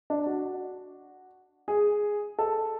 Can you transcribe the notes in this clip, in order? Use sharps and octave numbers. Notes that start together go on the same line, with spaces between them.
D4
F#4
G#4
A4